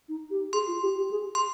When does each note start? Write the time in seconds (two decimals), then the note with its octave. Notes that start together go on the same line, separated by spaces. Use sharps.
0.08 D#4
0.30 G4
0.53 G#4 C6
0.67 F4
0.81 G4
0.97 G4
1.11 G#4
1.35 C6